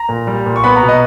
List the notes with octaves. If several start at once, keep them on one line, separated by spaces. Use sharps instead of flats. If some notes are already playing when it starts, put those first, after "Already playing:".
Already playing: A#5
A#2
G3
A#2
C#6
B3 B5
A#5
B2
D#5